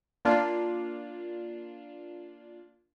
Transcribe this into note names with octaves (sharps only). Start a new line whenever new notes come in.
A#3 D4 F4